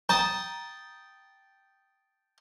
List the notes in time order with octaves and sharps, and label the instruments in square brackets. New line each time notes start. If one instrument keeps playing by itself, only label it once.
[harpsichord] G5 A5 D#6 [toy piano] A#5